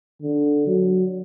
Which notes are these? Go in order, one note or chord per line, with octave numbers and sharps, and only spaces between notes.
D3
F#3